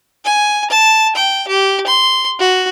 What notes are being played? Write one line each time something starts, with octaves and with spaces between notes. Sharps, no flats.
G#5
A5
G5
G4
C6
F#4